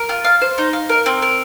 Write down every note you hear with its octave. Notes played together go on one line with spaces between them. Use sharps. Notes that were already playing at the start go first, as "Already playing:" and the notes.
Already playing: A#4
F4
F5
C5
D#4
F5
A#4
C4
A#4